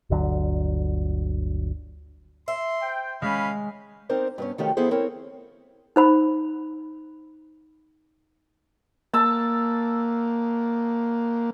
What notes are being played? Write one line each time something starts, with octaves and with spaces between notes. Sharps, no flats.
G1 D2 D3 F#3
E5 C6
C5 G5
G#3 C#4 F5 B5
C4 D#4 A#4 C5 D5
G2 B3 C#4
D#3 F3 A3 C#4 F#4 G4
F3 B3 E4 G#4 A4 C5
C4 E4 A#4 C#5
D#4 C5 B5
A#3 A5 E6